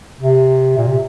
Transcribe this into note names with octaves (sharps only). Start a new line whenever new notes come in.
C3
A#2
C3